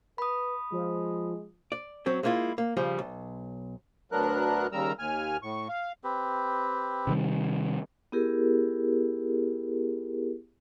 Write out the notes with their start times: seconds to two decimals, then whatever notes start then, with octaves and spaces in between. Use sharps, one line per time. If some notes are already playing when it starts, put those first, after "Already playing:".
0.18 B4 B5 D#6
0.72 F3 G#3
1.72 D5
2.06 F#3 C4 C#4
2.23 G#3 A#3 C#4 E4 F4
2.58 A#3
2.77 C#3 F3 G3
2.99 B1
4.12 D2 F#3 B3 D4 A#4 F#6
4.72 D#2 C#3 G3 A#4 A#5 E6
4.99 D#2 G#5 F6
5.42 A2 C#6
5.69 F5
6.04 C4 G4 B4
7.07 C3 D#3 G3
8.12 B3 E4 G4 G#4 A#4